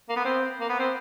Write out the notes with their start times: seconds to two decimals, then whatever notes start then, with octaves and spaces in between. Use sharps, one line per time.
0.09 A#3
0.16 B3
0.24 C4
0.60 A#3
0.69 B3
0.79 C4